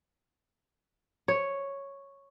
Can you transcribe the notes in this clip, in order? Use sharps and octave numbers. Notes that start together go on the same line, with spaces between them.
C#5